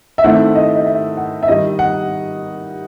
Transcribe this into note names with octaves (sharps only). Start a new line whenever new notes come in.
E5
D#3 A3 C4 E4 F#5
D#5
D#5
E5
F#5
E5
D#3 G3 D#4 D#5
F#5